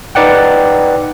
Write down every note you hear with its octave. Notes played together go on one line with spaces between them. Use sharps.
D#4 B4 D5 F#5 G5